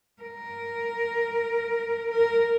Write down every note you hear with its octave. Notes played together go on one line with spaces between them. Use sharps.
A#4
A#4